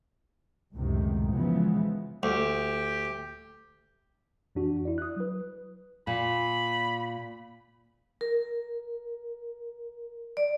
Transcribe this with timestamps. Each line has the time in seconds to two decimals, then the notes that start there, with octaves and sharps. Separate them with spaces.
0.74 C#2 F#2 A2 C3 D#3
1.33 C#3 E3 F3 G#3 B3
2.23 D2 G4
4.55 F2 E3 D4 F#4
4.85 E4 D5
4.98 D#6 F#6
5.17 F#3 B4
6.07 A#2 B5
8.21 A#4
10.37 D5